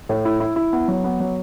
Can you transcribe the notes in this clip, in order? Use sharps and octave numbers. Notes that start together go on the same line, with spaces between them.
A2
E4
E4
E4
B3
F#3
B3
F#3